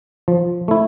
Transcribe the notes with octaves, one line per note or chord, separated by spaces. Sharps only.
F3
A3 E4